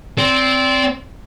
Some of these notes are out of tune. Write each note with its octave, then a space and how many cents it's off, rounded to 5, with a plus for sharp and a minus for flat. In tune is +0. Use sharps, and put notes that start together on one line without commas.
C4 +0 D5 -25